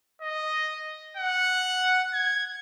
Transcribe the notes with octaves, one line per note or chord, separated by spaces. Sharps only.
D#5
F#5
G#6